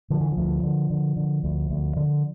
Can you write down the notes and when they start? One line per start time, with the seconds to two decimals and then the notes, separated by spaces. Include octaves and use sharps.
0.10 D3 F3
0.21 E3
0.32 F3
0.37 D2
0.63 D3
0.90 D3
1.17 D3
1.44 D2
1.70 D2
1.97 D3